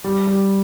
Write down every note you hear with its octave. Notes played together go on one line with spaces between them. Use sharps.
G3
G3